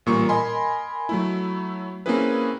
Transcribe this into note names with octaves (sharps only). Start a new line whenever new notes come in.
A1 A#2 G3 A#3 C#6
A#4 D#5 G#5 B5 C6
F#3 A3 E4
A#3 C4 C#4 E4 G#4 B4